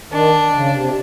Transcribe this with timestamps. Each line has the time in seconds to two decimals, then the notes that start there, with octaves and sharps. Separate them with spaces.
0.12 D#3 D4
0.53 C#3
0.72 C3